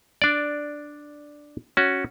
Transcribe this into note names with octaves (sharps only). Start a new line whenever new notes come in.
D4 D5
C#4 F#4